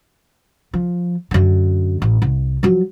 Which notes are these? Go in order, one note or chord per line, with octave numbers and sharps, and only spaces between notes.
F3
F#2 D3
A1
C2
F3 F#3